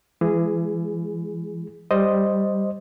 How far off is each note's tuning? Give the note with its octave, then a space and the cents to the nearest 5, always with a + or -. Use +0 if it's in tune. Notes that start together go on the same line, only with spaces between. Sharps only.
E3 +35 G#3 +0 G#4 +0
G3 +0 C5 +0 D#5 +0